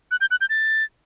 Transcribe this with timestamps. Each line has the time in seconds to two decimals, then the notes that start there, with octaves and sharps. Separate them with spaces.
0.11 F#6
0.21 G6
0.31 F#6
0.41 G6
0.49 A6